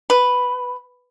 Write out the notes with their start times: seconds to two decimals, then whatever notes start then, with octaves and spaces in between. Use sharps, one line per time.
0.10 B4